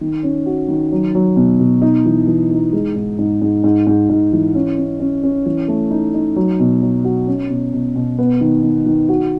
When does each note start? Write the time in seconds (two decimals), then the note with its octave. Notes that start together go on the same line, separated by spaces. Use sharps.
0.01 D#3
0.23 C#4
0.46 F#4
0.68 D#3
0.92 F#3
1.15 F#3
1.36 B2
1.60 B2
1.82 D#4
2.06 E3
2.27 E3
2.51 D#4
2.73 G#3
2.96 G#2
3.19 G#2
3.42 G#2
3.64 G#2
3.87 G#2
4.09 G#2
4.33 E3
4.55 C#4
4.78 C#4
5.00 C#4
5.23 C#4
5.46 E3
5.68 A3
5.91 D#4
6.14 D#4
6.36 F#3
6.60 B2
6.82 F#3
7.04 F#4
7.27 C#4
7.50 B2
7.73 B2
7.96 B2
8.19 B3
8.41 D#3
8.63 D#3
8.86 D#3
9.09 F#4